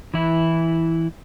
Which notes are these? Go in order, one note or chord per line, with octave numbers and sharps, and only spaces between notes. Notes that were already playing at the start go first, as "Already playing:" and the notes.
E3 E4